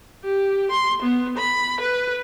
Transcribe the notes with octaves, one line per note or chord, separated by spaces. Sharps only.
G4
C6
B3
B5
B4